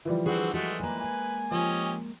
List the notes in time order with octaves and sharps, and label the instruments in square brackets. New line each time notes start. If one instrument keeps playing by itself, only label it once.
[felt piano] E3 F3 G3
[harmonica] D3 C4 F#4 [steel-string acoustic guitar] G#4 B4 F#5
[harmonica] G#3 A3 [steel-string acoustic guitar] F#4
[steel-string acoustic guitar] G#3 A#3 [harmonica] B4 [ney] G#5
[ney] G#5
[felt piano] F3 [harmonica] C#4 G4 D#5